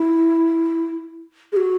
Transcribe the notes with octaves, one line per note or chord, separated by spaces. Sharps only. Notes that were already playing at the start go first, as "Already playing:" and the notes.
Already playing: E4
G#4
F#4